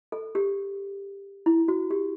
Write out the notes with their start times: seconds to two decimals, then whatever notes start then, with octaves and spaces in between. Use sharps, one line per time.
0.12 A4
0.35 G4
1.46 E4
1.68 F#4
1.91 G4